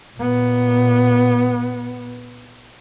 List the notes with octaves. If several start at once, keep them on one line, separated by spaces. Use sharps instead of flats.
A#2 B3